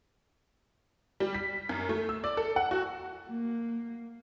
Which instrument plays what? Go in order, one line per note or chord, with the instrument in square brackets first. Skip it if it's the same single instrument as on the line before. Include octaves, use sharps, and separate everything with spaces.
[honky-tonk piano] G3
B6
F#2
A3
E6
D5
A4
F#5
F#4
[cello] A#3